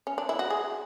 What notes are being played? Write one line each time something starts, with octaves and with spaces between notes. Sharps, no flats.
C#4
D4
E4
F#4
G#4